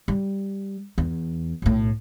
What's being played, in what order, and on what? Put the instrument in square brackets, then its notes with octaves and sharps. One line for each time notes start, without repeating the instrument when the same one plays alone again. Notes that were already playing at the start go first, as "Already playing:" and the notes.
[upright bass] G3
E2
B1 A2